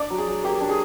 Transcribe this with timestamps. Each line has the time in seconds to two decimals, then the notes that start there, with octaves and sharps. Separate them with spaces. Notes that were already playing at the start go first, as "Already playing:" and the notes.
Already playing: D4 D5
0.10 F#3
0.18 G#4
0.27 F#3
0.44 A#3 G4
0.61 D4
0.69 G#4